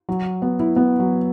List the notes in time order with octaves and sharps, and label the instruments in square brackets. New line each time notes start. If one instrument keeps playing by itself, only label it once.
[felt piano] F#3
B3
E4
B3
F#3